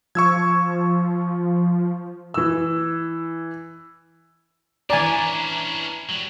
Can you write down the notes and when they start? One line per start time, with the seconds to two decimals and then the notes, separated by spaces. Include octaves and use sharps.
0.15 F3 C#6 E6 G#6
2.34 E3 E6
4.90 E3 C#4 D4 D5 G#5 A#5
6.09 F#3 G3